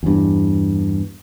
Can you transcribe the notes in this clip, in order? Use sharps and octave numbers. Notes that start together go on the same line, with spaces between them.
E2 G2